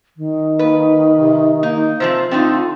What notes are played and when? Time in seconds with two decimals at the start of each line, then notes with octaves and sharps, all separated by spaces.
0.17 D#3
0.59 A#3 B4
1.16 C3
1.63 A#3 D#4
2.00 C3 F3 C4 F4 C5
2.31 D3 A3 C4 D#4